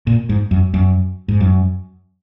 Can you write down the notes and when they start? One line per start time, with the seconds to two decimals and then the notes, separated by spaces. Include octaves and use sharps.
0.07 A#2
0.29 G#2
0.51 F#2
0.74 F#2
1.28 G#2
1.40 F#2